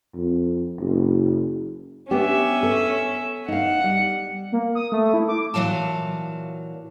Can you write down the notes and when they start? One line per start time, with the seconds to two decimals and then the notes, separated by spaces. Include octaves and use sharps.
0.16 F2
0.79 F#1
2.11 B3 C#4 D4 G4 E5
2.63 A4
3.48 D#4 F5 F#5
3.84 G3
4.52 A#3
4.75 D#6
4.92 A3
5.14 E4
5.28 D6
5.54 A#2 E3 F#3 F5 A5